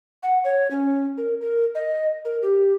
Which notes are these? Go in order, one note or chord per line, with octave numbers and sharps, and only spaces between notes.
F#5
C#5
C#4
A#4
A#4
D#5
A#4
G4